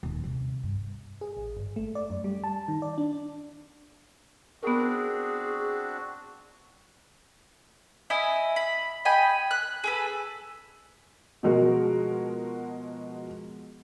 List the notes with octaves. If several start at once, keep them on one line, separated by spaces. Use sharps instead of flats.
D#1
C3
G2
G#4
A1
G1
A3
D5
F#2
G3
A5
D#3
D5
D4
B3 C4 D4 F#4 G#4 A#4
E4 D#5 G#5
B5
D#5 G5 G#5 B5
F#6
G#4 A4 B4
B2 F3 G#3 F#4 A#4